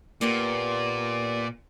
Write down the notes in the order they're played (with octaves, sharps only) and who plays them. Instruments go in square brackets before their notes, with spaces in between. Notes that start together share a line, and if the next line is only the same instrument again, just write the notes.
[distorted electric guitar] A#2 [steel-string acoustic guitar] A#3 B3 G4 [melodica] D5